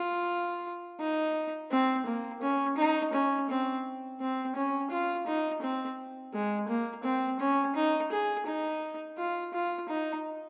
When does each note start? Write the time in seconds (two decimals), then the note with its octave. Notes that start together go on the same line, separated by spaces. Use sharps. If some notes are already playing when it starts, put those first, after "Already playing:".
Already playing: F4
1.00 D#4
1.71 C4
2.07 A#3
2.42 C#4
2.78 D#4
3.13 C#4
3.50 C4
4.21 C4
4.56 C#4
4.91 F4
5.27 D#4
5.62 C4
6.33 G#3
6.69 A#3
7.04 C4
7.40 C#4
7.76 D#4
8.12 G#4
8.46 D#4
9.18 F4
9.54 F4
9.89 D#4